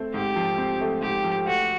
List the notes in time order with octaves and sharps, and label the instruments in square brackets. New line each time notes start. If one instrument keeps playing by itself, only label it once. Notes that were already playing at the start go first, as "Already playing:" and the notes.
Already playing: [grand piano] A3 C4
[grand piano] G#2 [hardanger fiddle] G4
[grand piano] F3
C4
A3
[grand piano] G#2 [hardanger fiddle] G4
[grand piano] F3
[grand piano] A3 [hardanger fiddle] F#4